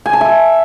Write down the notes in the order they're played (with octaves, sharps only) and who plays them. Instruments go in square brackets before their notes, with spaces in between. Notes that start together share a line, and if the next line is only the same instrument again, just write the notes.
[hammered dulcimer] G#5
A5
E5